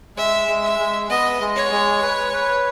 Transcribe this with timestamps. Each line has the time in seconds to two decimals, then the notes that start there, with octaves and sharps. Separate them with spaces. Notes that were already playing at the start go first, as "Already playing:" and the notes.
0.16 G#3 E5
0.48 G#3
0.63 E5
0.79 G#3
1.10 B3 D#5
1.41 G#3
1.55 C#5
1.72 G#3
2.02 B4
2.33 B4